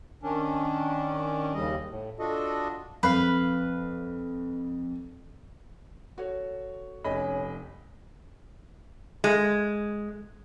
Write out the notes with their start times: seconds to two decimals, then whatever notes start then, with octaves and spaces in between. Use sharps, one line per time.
0.23 D#3 C#4 D4
1.54 D#2 C#3 G3 D#5
1.89 A2
2.19 D4 F4 F#4 A4 D#5
3.03 F2 B4 F5
6.18 F#4 A4 C#5
7.04 F1 C#4 D#5 B5
9.24 G#3